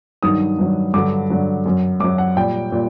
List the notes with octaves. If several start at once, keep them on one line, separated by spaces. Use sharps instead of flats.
G2 D#3 F#3 D#6
G2 D#3 F#3
G2 D3 F#3 D6
G2 D3 F#3
F#2 F#3
F#2 F#3 D6
F#5
A#2 G3 G5
A#2 G3